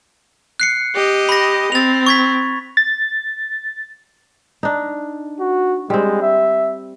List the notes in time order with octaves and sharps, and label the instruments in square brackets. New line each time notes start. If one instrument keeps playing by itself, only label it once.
[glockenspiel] F#6 C7 C#7
[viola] G4 D#5
[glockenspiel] B5 A#6
[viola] C4 [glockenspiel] A6 F7
[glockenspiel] C#6 G#6 B6
[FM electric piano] A6
[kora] D4 D#4
[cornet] F#4
[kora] G3 C4 [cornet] G#3
[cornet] E5